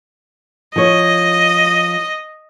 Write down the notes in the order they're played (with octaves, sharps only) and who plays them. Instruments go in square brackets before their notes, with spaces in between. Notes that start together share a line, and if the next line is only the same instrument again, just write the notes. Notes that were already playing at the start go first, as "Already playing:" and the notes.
[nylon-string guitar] F3 C#5 [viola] D#5